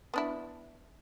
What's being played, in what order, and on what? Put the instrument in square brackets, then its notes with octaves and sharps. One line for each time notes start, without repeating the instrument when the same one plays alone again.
[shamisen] B3 D4 E4